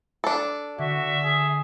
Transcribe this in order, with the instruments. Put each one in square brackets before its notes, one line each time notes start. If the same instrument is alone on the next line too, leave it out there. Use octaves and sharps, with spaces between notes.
[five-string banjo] D4 A4
[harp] D3 [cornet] F#4 [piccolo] E5
[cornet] G#4